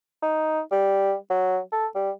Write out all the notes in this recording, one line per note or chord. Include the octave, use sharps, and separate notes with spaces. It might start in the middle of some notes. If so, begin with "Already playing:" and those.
D#4
G3
F#3
A4
G3